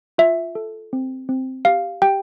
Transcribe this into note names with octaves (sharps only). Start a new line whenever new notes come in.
F4 E5
A4
C4
C4
G4 F5
G4 G5